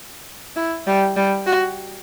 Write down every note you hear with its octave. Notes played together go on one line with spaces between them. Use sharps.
E4
G3
G3
F#4